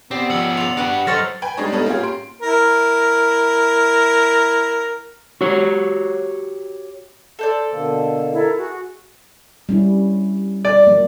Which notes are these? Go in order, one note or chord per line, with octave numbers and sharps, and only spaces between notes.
B3 C4 G4 C5 D5
F3 C#4 E6 C#7 F#7
F4 G#4 D5 F7
D4 F#4 G4 B4 F#5
F#2 A4 C5 C#5 D#5 F6 A6 A#6
B4 G5 G#5
G3 G#3 D4 D#4 C#5
B3 C#4 D#4 A4 B4
A#3 C#4 F4 G4 G#4
C6 D7
E4 A#4
F#4 G4 C#5
A4 C5 D5
B2 D3 A#3
E4 A4 A#4
F#4 G#4
G3 C#4 E4
D5
F#3 A#3